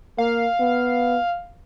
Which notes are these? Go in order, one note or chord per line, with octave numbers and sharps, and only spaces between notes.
A#3 F5
B3